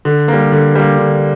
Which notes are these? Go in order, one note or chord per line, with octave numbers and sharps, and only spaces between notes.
D3
G3 A#3
D3
G3 A#3
D3